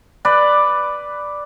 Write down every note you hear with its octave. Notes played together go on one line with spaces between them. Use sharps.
B4 D5